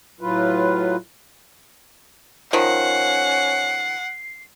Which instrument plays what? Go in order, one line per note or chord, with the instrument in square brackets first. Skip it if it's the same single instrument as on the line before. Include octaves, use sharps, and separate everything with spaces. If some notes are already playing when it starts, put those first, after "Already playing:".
[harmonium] A2 F#3 F4 B4
[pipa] D#3 F3 [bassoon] C#4 [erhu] F#5 [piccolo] C7